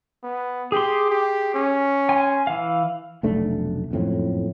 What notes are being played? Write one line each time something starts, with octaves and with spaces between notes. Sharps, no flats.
B3
G4 G#4 C6
G4
C#4
G#5 C6
E3 F5
F1 B1 A3 D4
F#1 F2 A2